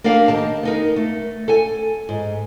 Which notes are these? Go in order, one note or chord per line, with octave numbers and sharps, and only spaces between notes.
A#3 D4 G4 A#4 F5
D#3 A5
B3 D#4 A#4
A3
A4 G#5
G#2